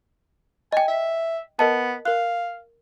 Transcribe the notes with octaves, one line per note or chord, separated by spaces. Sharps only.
D#5 G5 G#5
E5
B3 A#4 D#5 A5
A#4 F5 F#6